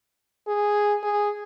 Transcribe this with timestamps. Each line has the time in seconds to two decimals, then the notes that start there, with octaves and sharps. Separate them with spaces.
0.48 G#4
1.03 G#4